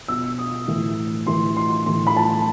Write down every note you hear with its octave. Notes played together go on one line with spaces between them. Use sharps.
B2 E6
D#6
A2 E3
A2 E3 C6
C6
A2 E3 C6
B5
A5